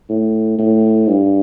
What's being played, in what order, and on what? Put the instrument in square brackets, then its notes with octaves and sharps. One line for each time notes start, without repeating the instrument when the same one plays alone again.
[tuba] A2
A2
G2